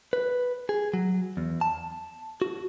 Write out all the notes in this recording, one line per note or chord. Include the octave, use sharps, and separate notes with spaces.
B4
G#4
F#3
E2
A5
F#4